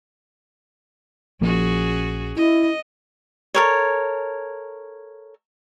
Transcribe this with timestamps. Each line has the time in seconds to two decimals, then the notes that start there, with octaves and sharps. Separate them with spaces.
1.41 A#1 F3 A#3 C#4 F#4 G#4
2.36 E4 D#5
3.54 A4 A#4 C#5